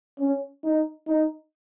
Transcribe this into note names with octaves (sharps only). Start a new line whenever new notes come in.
C#4
D#4
D#4